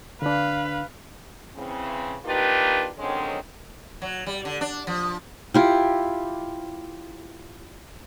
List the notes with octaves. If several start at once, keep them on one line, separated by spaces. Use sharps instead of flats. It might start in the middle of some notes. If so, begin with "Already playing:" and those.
D3 D4 B4 F5
C#3 E3 C4
A#3 D4 D#4 F4 G4 B4
D3 D#3 F#3 G#3 C4 C#4
F#3
G3
D3
D4
F3
E4 F4 G4